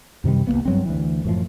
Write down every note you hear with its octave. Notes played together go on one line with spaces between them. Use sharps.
F#2 C3 D#3 G3
C2 G2 A#3 B3
G2 F#3 C4
D2 E3
F#2 A2 F3